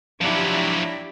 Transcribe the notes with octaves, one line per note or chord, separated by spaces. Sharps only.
F3 F#3 D4 E4 G4